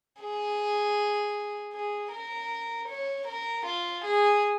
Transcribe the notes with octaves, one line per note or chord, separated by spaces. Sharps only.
G#4
G#4
A#4
C#5
A#4
F4
G#4